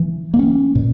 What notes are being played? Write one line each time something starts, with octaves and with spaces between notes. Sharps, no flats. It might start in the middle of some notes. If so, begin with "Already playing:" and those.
Already playing: E3
A#3
C#4
A#2